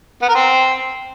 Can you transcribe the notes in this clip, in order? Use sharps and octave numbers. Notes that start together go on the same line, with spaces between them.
B3
A#4
C4